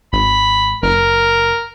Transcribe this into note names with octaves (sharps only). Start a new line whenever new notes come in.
G#1 B5
F#1 A#4